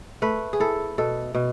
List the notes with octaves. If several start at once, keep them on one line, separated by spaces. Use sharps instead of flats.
A3 B4
G#4
E4 A4
B2 A4
B2